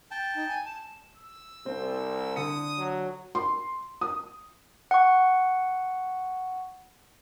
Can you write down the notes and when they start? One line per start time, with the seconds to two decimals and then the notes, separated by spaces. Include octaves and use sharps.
0.11 G5 A5
0.35 D#4
0.48 G#5
0.65 A5
1.17 E6
1.66 C2 C4
2.36 D3 D#6 C#7
2.78 F#3
3.35 C6
4.01 D#6
4.91 F#5 C#6